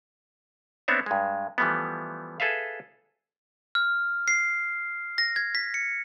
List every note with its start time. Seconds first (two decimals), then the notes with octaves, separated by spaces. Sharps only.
0.88 B3 C4 D4 C#5 E5
1.06 G2 G#3
1.58 E3 F3 G3 A3 B3
2.40 G#4 A4 B4 E5 F5
3.75 F6
4.28 C7
5.18 A#6
5.36 G#6
5.55 B6
5.74 C#7